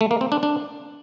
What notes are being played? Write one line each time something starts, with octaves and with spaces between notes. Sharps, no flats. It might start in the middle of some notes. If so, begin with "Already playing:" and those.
A3
A#3
C4
D4
D4